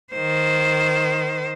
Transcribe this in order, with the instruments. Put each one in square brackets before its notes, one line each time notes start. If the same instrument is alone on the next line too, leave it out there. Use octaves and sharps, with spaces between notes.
[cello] D#3 C5